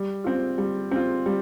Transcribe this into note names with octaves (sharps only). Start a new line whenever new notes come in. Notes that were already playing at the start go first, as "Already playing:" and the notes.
Already playing: G3
C4 F4
G3
C4 F4
G3